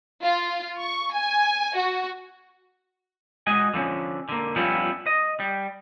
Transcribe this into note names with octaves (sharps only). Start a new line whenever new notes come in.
F4
C#6
G#5
F#4
G#3 F#4 D#5 G#5
D3 F3 A#3 C#4
D3 A#3
F3 G3 B3 C#4 E4 F4
D#5
G3